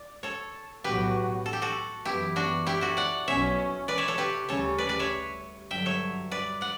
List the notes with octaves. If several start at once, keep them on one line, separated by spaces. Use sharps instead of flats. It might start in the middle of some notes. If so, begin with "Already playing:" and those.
Already playing: D5
A4 C#5
B1 A2 F#3 B3 F#4 G4 B4
A4
G4
F#4 A4
F#2 E3 B3 E4 G4
D4 F#4
E4 G4
F#4 A4
D5 F#5
B1 B2 F#3 C#4 C#5 E5
B4 D5
C#5 E5
A4 C#5
G4 B4
D2 C#3 G3 C#4 A4 C#5
B4 D5
B4 D5
C#5 E5
G2 D3 F#3 E5 G5
C#5 E5
B4 D5
D5 F#5